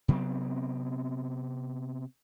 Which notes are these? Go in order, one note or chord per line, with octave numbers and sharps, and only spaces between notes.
C3 F#3 B3 C4